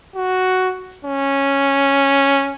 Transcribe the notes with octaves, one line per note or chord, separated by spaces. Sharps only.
F#4
C#4